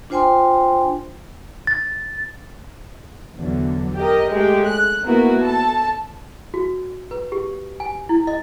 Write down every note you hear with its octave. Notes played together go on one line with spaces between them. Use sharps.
D4 F4 C5 G5 G#5 C6
A6
E2 D3 F#3
G4 A#4 D#5
G#3 A3 G4
F#6
A#3 B3 E4 F#4 A#4
A4 A5
F#4
B4
G4
G#5
E4
D#5